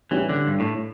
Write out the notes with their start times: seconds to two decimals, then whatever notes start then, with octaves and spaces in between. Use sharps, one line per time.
0.11 A2 E3 G3 C#4
0.29 D3
0.47 G2
0.60 A2